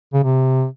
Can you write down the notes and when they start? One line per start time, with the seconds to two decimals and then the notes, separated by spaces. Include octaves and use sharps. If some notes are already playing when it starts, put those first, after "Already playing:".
0.13 C#3
0.24 C3